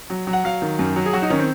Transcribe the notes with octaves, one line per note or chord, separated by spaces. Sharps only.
F#3
F#3
F#5
F#3 F5
D#3
F#2
F#3
G#4
F#3 F#4
D#4
D#3 C#4
C4